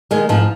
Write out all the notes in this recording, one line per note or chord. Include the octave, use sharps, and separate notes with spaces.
D#3 G#3
G#2 F3